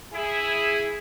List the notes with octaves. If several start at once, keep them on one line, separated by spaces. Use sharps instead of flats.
E4 G#4